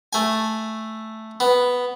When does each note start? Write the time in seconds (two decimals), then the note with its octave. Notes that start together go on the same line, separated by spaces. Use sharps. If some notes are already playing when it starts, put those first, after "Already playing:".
0.13 A3 G#5
1.40 B3